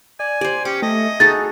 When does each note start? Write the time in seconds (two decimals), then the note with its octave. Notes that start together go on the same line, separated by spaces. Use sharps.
0.20 D5 G#5
0.41 G4 C5 D5
0.65 C#4 G4 D6
0.82 A3 D#5
1.20 D#4 F#4 G#4 A4 A6